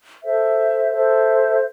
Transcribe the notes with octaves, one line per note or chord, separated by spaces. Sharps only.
A4 C5 E5
A4 C5 E5